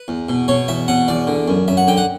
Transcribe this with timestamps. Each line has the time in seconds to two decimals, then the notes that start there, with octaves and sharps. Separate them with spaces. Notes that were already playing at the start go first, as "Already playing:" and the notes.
Already playing: B4
0.08 E2
0.29 B2
0.48 B2 C#5
0.68 E2 E5
0.88 B2 F#5
1.08 E2 D5
1.27 D3
1.48 F#2
1.68 F#2 E5
1.77 F#5
1.87 D3 G5
1.97 F#5